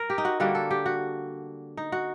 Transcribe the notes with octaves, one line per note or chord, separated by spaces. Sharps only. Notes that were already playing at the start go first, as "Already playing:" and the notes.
Already playing: A#4
G4
D#4
F#4
D3 G3 A#3 F#4
A4
G4
F#4
D#4
F#4